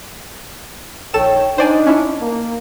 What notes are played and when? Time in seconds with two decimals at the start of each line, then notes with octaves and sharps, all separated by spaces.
1.14 A#1 D#3 A4 C#5 G5 E7
1.58 D4 D#4 C5 D5 G#5
1.87 C#4 E4
2.21 A#3